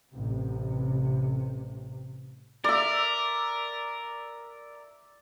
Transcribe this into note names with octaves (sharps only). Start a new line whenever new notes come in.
A1 C3
A#4 D5 E5